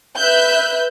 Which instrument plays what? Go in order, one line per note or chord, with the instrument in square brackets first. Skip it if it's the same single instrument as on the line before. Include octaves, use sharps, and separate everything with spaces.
[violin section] B4 E5 F#6 G6